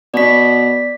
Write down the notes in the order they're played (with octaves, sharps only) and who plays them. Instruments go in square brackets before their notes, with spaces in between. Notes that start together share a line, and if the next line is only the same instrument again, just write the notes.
[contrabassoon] B2 [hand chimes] D5 B6